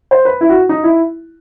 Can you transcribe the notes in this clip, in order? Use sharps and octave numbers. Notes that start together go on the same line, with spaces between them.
C5
B4
E4
F#4
D#4
E4